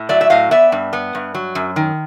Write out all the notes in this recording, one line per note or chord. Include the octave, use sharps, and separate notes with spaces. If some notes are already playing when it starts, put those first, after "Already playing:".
Already playing: A2
F#3 D5 E5
E5
A2 D#5 F5
B3 D5 E5
G2
B3
G2
F#3
F#2
D#3